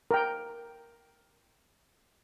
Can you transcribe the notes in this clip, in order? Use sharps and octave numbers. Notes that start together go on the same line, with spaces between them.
A#4 G5